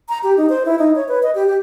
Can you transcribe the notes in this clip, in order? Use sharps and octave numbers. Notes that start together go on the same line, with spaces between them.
A#5
G4
D#4
C5
E4
D#4
C#5
B4
D#5
G4
G4